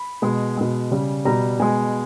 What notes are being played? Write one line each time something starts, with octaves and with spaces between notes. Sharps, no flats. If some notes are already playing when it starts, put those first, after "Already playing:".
Already playing: B5
B2 G#3
B2 G#3
C#3 G3
B2 G3 A#5
B2 G#3 G#5